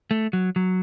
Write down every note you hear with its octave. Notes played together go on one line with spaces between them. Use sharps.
A3
F#3
F#3